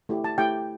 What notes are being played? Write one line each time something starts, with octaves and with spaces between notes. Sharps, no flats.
A3 E4 G4
A5
A3 E4 G4 G5